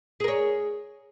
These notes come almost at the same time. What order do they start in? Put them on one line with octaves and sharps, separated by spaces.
G#4 A#4 C#5